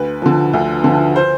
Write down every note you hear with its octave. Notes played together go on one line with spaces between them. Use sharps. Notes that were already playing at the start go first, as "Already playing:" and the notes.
Already playing: D2 B4
D3 F3
D2
D3 F3
C5